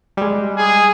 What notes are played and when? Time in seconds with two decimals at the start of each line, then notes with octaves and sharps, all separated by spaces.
0.17 G3 G#3
0.58 G#4